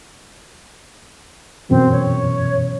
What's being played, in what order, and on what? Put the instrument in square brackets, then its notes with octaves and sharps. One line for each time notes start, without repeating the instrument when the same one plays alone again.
[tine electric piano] F#2 B2 E3 [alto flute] C4
[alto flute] C#5